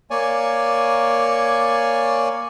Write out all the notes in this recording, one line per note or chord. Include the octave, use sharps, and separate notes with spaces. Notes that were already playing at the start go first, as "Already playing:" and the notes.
A#3 C#5 D5 G#5